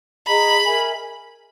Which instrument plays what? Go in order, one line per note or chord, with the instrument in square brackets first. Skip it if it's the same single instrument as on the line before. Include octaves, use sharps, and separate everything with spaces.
[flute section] G#4 D#5 A#5 [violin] B5
[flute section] A#4 E5 G#5